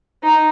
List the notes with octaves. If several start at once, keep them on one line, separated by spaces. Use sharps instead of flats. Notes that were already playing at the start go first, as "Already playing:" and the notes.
D#4